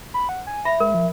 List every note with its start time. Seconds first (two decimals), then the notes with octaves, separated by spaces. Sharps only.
0.14 B5
0.29 F#5
0.47 G#5
0.65 E5 B5 A#6
0.80 G#3 A#4
0.94 F3